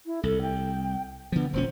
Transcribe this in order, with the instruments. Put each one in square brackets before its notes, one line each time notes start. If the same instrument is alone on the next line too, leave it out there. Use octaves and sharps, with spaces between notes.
[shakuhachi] E4
[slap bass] C2 [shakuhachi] A4
[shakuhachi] G5
[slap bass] D3 F3 [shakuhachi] B3
[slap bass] E1 A#2 C#4 [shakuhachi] C5